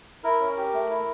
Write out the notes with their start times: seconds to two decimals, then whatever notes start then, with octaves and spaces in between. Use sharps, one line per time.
0.24 E4 A#4
0.40 C#4
0.57 G4
0.73 A3
0.90 E4